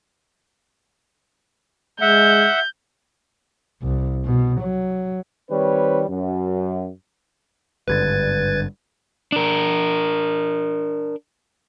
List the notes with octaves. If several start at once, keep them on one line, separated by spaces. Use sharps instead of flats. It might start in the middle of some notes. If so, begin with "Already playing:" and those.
G#3 E5 F#5 G6
C2
B2
F#3
D#3 G3 C4 B4 C#5
F#2
G#1 G2 D3 B4 G#6 A6
D4 A#4